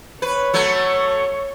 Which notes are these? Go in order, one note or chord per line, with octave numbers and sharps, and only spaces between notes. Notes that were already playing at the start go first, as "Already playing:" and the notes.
B4 C#5
F#3 A3